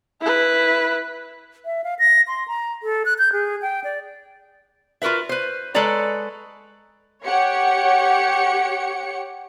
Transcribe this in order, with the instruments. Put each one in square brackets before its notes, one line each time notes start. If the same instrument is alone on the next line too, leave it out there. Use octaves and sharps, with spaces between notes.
[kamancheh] E4 B4
[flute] E5
F5
A#6
C6
A#5
A4
F#6
G6
G#4
G5
D5
[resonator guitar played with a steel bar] F4 F#4 A#4 B4 E5
B4 C5
G#3 A4 B4 C#5 D5 A#5
[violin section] G4 C#5 F#5 C#7